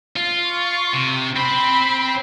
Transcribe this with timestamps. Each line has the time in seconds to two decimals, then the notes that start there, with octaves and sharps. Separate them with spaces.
0.16 F4
0.47 C#6
0.94 C3
1.36 C4 C5 B5